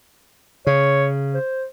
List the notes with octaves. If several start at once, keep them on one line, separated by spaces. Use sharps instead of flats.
C#3 C#5
C5